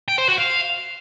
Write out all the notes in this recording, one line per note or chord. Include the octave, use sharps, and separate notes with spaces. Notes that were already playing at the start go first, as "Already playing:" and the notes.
G5
C5
F#4
F5